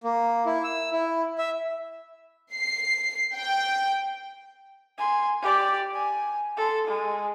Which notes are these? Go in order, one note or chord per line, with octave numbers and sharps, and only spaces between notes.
A#3
E4
E6
E4
E5
C7
G5
G#5 C6
G4 D5
G#5
A4 C6
G#3